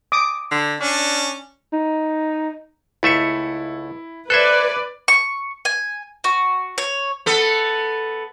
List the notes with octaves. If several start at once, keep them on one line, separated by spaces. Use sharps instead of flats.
D6 D#6
D3
C#4 D4
D#4
C#2 A3 E4 E5 C#7
A4 B4 C5 D5 E5 F#6 G#6
C#6
G#5
F#4
C#5
B3 A4